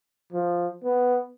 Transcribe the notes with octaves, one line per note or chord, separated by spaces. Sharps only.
F3
B3